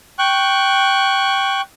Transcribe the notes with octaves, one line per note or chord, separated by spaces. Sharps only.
G5 C#6 F#6